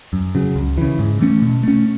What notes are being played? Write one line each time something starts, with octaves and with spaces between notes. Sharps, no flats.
F#2
C#3 F#3
C#2
C#3 E3
G#2
E3 A3 C#4
B2
A3 C#4